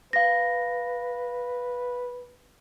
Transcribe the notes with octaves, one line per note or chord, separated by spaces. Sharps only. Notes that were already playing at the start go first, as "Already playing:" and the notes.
B4 F5 A#6